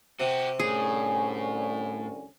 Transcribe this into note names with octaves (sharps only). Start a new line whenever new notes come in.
C3 F#4 G4
C2 A2 D3 C#4 G#4